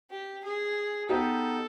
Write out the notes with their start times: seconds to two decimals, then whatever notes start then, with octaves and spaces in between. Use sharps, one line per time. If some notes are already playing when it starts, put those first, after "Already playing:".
0.11 G4
0.44 G#4
1.09 B3 D#4 G4 A4